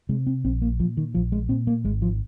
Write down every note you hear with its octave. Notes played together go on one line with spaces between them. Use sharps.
C3 G#3
C4
A#1 C4
A#3
A#2 F3
D#3
A#1 F3
G#3
A#2 C4
A#3
G#1 G#3
F3